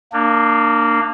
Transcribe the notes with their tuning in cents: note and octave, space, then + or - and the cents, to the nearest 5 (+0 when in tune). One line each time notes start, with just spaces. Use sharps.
A#3 -10 D4 +25